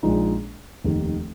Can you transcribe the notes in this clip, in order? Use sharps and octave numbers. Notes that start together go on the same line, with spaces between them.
A#1 A#2 G#3 D#4
F1 D#2 D#3